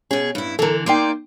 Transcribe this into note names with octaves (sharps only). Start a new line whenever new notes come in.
B2 C#4 G#4
G2 E4
D3 E3 A4 A#4
A#3 D#4 D5 G5 C6 D6